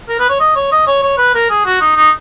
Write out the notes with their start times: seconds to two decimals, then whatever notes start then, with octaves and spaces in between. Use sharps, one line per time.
0.09 A#4
0.19 B4
0.30 C#5
0.40 D#5
0.56 C#5
0.72 D#5
0.87 C#5
1.03 C#5
1.18 B4
1.34 A#4
1.50 G#4
1.66 F#4
1.81 D#4
1.96 D#4